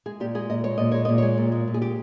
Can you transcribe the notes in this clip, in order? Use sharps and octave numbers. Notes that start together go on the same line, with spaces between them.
G#3 G#4
A#2 G4
G#3 G#4
A#2 D#5
G#3 C#5
A#2 D#5
G#3 C#5
A#2 D#5
G#3 C#5
A#2
G#3
A#2
G#4
G#3 G4